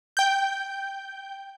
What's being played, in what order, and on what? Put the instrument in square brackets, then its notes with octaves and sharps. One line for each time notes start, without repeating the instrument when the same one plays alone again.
[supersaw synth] G5 G6